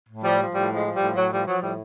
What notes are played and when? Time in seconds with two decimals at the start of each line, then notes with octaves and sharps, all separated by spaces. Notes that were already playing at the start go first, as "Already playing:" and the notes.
0.09 A2
0.24 F3 G3
0.40 F3
0.54 A2 G3
0.71 F3
0.76 G#3
0.86 F3
0.96 G3
1.01 A2
1.16 A2 F#3
1.31 F3 G3
1.47 F3 F#3
1.62 A2 G3